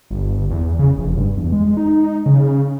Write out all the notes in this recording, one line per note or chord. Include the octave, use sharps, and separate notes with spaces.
G1
E2
C#3
F1
G2
E2
G#3
D#4
C#3